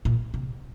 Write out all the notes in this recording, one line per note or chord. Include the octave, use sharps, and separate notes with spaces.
A#2
C3